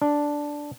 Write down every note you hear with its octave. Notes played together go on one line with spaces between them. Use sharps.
D4